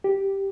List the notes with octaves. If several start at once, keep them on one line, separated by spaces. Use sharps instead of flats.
G4